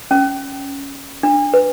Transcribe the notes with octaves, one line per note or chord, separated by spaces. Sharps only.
C#4
D4
B4